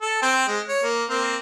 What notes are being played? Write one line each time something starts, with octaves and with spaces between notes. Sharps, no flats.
A4
C4 G5
G#3
C#5
A#3
A#3 C4